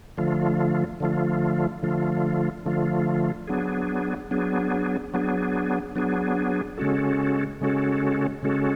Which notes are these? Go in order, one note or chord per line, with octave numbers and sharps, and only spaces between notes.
D3 F3 A3 F4
D3 F3 A3 F4
D3 F3 A3 F4
D3 F3 A3 F4
F#3 B3 D4 G#4
F#3 B3 D4 G#4
F#3 B3 D4 G#4
F#3 B3 D4 G#4
C#3 G#3 C#4 F#4 A4
C#3 G#3 C#4 F#4 A4
C#3 G#3 C#4 F#4 A4